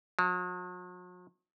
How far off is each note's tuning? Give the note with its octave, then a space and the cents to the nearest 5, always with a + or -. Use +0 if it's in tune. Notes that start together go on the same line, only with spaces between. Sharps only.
F#3 -45